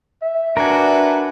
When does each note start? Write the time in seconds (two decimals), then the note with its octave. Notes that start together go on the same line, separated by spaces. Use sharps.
0.22 E5
0.57 D4 F#4 A#4 B4 G#5